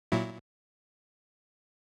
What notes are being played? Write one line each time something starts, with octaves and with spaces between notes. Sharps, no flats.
A#2 F#3 E4